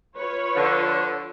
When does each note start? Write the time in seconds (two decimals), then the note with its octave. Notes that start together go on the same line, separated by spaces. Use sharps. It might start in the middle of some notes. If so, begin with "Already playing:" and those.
0.18 F4 B4 C#5
0.55 D3 F3